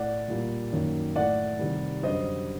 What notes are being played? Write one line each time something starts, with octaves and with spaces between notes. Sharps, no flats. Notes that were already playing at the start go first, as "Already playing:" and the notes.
Already playing: A2 A3 D5 F#5
A#2 G3 A#3
F#2 D#3 F#3 A#3
A2 A3 D5 F#5
C3 D#3 G3
F#2 D3 G3 C5 D#5